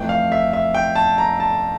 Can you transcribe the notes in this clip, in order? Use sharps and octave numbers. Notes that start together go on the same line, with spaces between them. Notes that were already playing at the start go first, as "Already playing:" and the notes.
Already playing: F2 E3 A3 G5
F5
E5
E5
G5
A5
A#5
A5